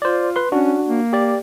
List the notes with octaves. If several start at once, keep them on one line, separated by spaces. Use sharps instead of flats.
F4 C5 D5
B4 C6
C#4 D4 F#4
A#3
G4 D5